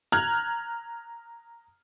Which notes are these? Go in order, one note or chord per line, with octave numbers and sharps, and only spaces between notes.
A#5 F6 F#6 G#6